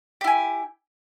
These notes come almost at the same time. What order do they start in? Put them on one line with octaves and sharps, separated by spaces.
G4 E4 G#5